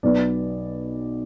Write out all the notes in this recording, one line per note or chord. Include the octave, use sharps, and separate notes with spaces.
B1 B2 B3 D5